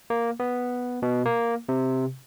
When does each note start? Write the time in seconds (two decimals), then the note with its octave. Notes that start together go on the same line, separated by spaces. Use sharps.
0.10 A#3
0.40 B3
1.02 B2
1.25 A#3
1.69 C3